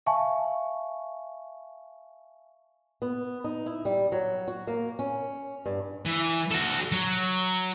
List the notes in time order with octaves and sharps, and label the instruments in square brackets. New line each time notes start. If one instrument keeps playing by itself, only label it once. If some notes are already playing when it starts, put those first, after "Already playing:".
[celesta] E5 F5 G#5 A5 C#6
[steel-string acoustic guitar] B3
D#4
E4
G3
F#3
F#4
A#3
C#4
G2
[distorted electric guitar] E3
F#4 A4
F#3